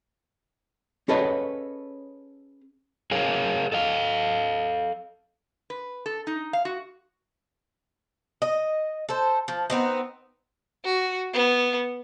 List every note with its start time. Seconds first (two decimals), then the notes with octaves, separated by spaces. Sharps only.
1.08 C#4 G#4 A4 B4 C#5 D#5
3.11 G#4 A#4 C#5 F5
3.72 A4 D#5 F5
5.70 B4
6.06 A4
6.27 D#4
6.53 F5
6.65 F#4
8.42 D#5
9.09 A4 C5
9.48 F3
9.70 B3 C4 D#4
10.85 F#4
11.33 B3